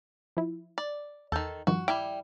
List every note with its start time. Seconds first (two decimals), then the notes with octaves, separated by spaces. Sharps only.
0.37 F3 E4
0.78 D5
1.32 E2 D#3 A4 G6
1.67 G2 D#3 F3 F#4
1.88 G3 E4 G5 D6